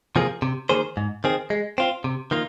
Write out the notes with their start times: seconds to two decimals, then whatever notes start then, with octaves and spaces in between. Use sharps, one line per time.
0.16 C3 F3 A#3 G#4
0.42 C3
0.69 D#3 A#3 G#4 C5
0.97 G#2
1.24 D#3 C4 G#4
1.50 G#3
1.78 C4 F4
2.04 C3
2.31 D#3 A#3 F4